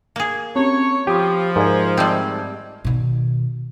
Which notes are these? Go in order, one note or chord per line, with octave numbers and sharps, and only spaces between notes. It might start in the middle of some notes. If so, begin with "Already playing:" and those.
A#3 G#4
C4 C#4 C#5
F3 G4 B5 D#6 D#7
G#2 A#4 D5 G#6
G3 A3 C4 D#5 G#6
B2 D#3